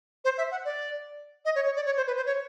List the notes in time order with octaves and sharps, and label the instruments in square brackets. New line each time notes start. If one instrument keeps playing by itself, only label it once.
[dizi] C5
E5
F#5
D5
D#5
C#5
C#5
D5
C#5
C5
B4
C5
C#5